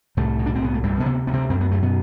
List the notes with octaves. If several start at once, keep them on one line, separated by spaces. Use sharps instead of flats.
C2 A2 A3
B2
D4
C4
C2 B3
A3
D2 G2 G3
B2 B3
C3
D2 B3
C3 C4
F#2 C4
B3
F#2 A3
B2 B3